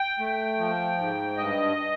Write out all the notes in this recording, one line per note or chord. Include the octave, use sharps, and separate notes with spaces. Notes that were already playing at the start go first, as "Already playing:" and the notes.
Already playing: G5
A3
F3
G#2
G2 D#5